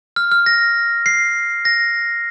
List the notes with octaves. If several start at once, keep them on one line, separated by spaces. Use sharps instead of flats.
F6
F6
A#6
C7
A#6